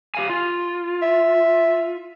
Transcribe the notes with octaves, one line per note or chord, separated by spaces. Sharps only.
G4 F5 G#5
F4
E5